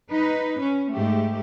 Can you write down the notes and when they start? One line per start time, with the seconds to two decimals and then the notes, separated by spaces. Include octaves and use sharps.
0.11 D#4 B4
0.60 C#4
0.93 G#2 A3 G4